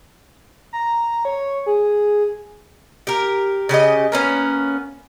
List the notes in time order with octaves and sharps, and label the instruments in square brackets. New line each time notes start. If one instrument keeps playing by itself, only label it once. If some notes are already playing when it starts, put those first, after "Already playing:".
[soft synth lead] A#5
C#5
G#4
[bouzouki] G4 A#4
C#3 G4 A#4 D#5
A#3 B3 C#4